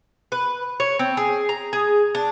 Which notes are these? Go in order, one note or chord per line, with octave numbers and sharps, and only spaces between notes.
B4
C#5
C4
G#4
A#5
G#4
D4